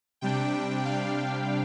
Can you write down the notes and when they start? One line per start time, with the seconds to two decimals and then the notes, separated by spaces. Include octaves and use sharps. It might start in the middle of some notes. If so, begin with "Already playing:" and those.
0.21 C3 G3 D4 G5
0.85 F5